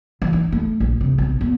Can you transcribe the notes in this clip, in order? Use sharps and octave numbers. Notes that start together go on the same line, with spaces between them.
E3
D#4
A3
A#1
C3
B1
B3